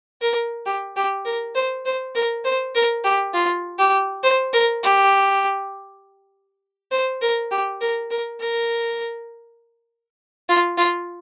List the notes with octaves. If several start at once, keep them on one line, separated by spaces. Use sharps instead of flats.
A#4
G4
G4
A#4
C5
C5
A#4
C5
A#4
G4
F4
G4
C5
A#4
G4
C5
A#4
G4
A#4
A#4
A#4
F4
F4